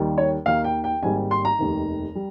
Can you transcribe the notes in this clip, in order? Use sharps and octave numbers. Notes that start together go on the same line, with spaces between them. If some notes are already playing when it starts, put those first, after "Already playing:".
Already playing: D#2 D#3 G3 A#3
C#5
D#2 D#3 A#3 F5
G5
G5
G#1 G#2 G3 A#3 G#5
C6
A#5
F1 D#2 D#3
G3